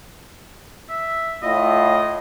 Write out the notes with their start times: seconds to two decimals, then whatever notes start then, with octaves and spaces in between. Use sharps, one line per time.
0.89 E5
1.43 A2 E4 F4 D#5